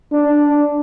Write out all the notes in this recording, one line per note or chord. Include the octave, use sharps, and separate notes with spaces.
D4